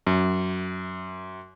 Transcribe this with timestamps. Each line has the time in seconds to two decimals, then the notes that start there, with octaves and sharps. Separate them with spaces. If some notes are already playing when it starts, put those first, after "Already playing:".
0.07 F#2